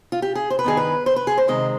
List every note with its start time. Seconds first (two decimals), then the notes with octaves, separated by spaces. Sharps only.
0.12 F4
0.22 G4
0.35 G#4
0.50 C5
0.59 B4
0.64 G2 D#3 B3 G#4
0.77 B4
1.06 C5
1.16 B4
1.27 G#4
1.38 C5
1.48 C3 D#3 G#3 C4 D#5